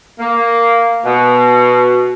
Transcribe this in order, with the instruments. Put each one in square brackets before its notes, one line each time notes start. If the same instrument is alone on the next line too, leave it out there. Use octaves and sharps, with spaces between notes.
[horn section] A#3
B2